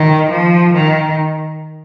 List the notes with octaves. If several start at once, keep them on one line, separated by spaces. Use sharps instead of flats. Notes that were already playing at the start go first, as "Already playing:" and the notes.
Already playing: D#3
F3
D#3